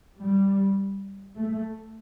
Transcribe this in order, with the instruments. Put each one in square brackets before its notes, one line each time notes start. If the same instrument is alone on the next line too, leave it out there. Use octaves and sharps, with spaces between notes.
[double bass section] G3
A3